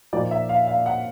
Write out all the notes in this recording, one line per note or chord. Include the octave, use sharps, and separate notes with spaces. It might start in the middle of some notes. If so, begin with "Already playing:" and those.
A#2 F3 A#3 D#4 D5
E5
F5
F5
F#5